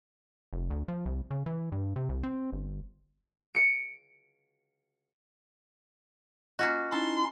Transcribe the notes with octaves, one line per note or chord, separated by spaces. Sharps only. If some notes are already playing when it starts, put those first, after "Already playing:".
F1
D2
F3
C2
C#3
E3
G2
C3
C2
C4
G1
C#7 D7
A#3 C#4 F4 F#4 D#5
C#4 D#4 E4 A4 C6